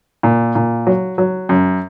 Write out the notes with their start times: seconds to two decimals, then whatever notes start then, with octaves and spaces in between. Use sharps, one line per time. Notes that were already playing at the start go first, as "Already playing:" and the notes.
0.23 A#2
0.55 A#2
0.87 F#3
1.18 F#3
1.49 F#2